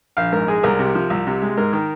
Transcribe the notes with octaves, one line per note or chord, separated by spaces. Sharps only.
A#1 F5
G#2 A#4
G#3 G#4
C2 A#4
C3
F3
C2
C3
G#3
G#2 A#4
D#3